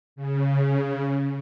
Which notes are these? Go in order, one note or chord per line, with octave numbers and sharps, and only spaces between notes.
C#3